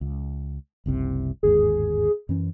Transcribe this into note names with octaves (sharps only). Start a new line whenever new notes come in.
C#2
F#1 C2 C3
G1 D#2 G#2 G#4
F#2 E3 C#4